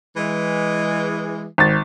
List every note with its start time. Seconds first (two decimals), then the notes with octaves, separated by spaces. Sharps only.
0.17 E3 G#3
1.58 G#1 A6